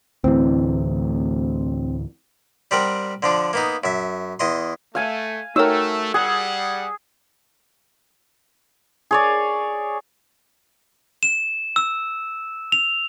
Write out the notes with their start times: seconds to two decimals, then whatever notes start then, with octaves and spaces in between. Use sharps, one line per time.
0.24 D2 A2 E3 C4
2.71 G3 C4 A#4 F#5
3.22 D3 F3 D4
3.53 A#3 B3 D#4
3.84 F#2 E5
4.39 E2 D#5 C6
4.95 A3 F5 G#5
5.56 A3 D#4 F#4 A#4 C#5 G5 E6
6.14 G3 G#4 F#5
9.11 G#4 C#5 D5
11.23 E7
11.76 E6
12.72 F7